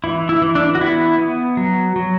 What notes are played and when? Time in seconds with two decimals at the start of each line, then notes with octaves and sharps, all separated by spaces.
0.04 E3 E4
0.29 E4
0.42 E3
0.55 D4
0.75 F#4
0.81 B3 E4
1.18 B3
1.57 F#3
1.96 F#3